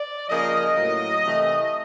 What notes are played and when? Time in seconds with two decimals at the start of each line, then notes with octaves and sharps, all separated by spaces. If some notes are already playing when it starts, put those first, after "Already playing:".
Already playing: D5
0.29 C#3 F3 A#3 D#5
0.76 A2 F#3 A#3
1.23 C3 E3 A3